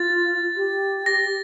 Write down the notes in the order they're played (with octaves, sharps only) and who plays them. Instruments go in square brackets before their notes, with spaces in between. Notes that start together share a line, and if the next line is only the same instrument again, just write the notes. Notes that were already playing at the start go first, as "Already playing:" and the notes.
Already playing: [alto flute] F4 [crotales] A6
[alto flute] G4
[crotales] A#6